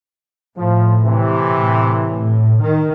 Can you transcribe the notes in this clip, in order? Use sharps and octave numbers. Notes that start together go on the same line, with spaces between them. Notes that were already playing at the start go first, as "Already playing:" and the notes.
A2 F3
C3 E3
A2
D#3